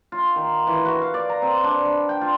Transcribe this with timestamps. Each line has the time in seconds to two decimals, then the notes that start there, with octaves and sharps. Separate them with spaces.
0.12 F4
0.36 D#3
0.67 E3
0.85 F#4
1.02 F5
1.14 D5
1.29 A#5
1.42 C4
1.63 D4
1.85 B5
2.09 G5
2.21 F4